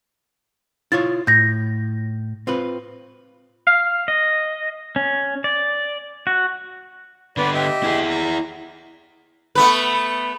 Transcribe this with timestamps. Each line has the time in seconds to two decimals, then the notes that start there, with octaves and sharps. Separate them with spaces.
0.92 E4 F4 C#5 A6
1.27 A2 G6 A#6
2.47 C4 F4 B4
3.67 F5
4.08 D#5
4.96 C#4
5.44 D5
6.27 F#4
7.37 D3 B3 B4 D5
7.54 G4 D#5 E5
7.83 E4 G#4
8.10 A#5
9.55 A3 B3 B4